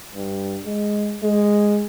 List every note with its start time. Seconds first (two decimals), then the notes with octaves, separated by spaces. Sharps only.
0.15 G2
0.66 G#3
1.23 G#3